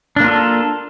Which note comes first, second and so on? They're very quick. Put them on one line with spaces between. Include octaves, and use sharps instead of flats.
D4 A#3 F4 A4